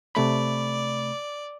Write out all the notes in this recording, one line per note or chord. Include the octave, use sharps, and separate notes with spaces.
C3 A3 D5 B5